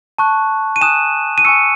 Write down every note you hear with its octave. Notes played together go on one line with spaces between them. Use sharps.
A5 C#6 F#6
D#7
G#5 D#6 F#6 E7
D#7
G#5 C#6 E6 C#7